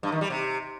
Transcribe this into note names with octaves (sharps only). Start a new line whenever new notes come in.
G2
D#3
G3
C3